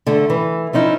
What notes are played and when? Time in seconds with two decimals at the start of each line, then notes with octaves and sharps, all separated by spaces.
0.06 D3 A3
0.30 E3
0.73 F3 C#4 D#4 E4